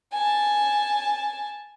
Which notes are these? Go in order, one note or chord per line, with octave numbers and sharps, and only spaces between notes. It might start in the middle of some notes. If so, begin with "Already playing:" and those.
G#5 A5